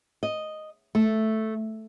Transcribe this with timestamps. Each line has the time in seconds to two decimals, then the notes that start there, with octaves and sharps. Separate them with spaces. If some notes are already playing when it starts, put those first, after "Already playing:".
0.23 D#5
0.95 A3